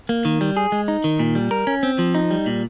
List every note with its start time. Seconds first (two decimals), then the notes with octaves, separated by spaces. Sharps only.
0.09 A#3
0.25 D#3
0.41 G3
0.57 G#4
0.72 G#3
0.88 D#4
1.04 D#3
1.19 A#2
1.35 G3
1.51 A#4
1.67 C#4
1.83 C4
1.99 F3
2.15 D#4
2.31 G3
2.46 A#2